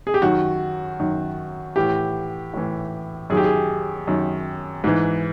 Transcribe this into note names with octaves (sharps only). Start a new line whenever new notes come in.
G#4
G4
F#2 D#3 F#4
F#2 D#3
A2 E3 G4
A2 E3
F#2 D#3 G#4
G4
G#4
F#2 D#3
G#2 E3